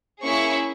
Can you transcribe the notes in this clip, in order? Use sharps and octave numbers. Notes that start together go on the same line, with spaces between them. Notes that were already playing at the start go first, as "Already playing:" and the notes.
A#3 C#4 E4 G#4 C#6